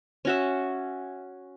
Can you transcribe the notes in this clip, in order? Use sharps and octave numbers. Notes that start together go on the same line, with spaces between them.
C#4 F#4 E5